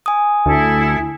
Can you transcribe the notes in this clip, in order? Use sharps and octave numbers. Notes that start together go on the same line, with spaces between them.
G#5 D#6
D2 E4 A4